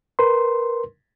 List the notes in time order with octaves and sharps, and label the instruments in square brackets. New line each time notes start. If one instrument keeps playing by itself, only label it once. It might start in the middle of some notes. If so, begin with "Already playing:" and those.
[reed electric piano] A#4 B4 C6